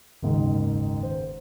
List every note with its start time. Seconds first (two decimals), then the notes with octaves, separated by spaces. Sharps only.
0.22 F#1 D#2 G#2
1.03 C5